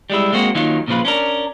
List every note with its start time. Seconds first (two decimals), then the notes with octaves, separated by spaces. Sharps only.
0.10 G3 G#3 E4
0.33 G#3 A#3 C4 F#4
0.55 D#3 F#3 A#3 C#4 D#4 F4
0.88 A#2 C#3 F3 F4 B4
1.05 C#4 D4 A#4